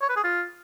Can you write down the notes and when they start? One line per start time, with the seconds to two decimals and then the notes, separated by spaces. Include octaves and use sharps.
0.02 C#5
0.09 B4
0.16 G#4
0.24 F4